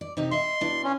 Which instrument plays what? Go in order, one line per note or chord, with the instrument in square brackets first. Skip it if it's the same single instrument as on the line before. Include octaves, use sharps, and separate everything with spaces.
[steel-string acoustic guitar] D5
C3 D#4 G4
[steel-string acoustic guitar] D#5 E5 [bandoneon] C6
[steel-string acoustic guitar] B2 D4 E4
[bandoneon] C#4